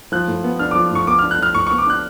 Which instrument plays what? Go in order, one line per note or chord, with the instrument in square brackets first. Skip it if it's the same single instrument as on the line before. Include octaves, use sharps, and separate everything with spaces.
[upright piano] F3 [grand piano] F#6
[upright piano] A2
B3
[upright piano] D4 [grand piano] F6
[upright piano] F3 [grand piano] D6
[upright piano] A2 [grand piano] C#6
[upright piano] B3 [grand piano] D6
[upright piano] D4 [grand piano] F6
[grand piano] F#6
[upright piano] F3 [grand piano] F6
[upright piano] A2 [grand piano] C#6
[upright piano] B3 [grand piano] C#6
[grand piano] D6
[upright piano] D4 [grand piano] F#6